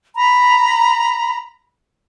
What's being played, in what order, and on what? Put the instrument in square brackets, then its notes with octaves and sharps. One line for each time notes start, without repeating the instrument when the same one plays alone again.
[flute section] A#5 B5